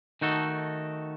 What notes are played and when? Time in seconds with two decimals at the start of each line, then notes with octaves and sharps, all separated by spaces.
0.21 D#3 A3 D#4 F#4 A4